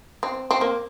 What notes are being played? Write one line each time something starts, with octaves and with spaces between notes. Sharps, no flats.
C4
C4
A#3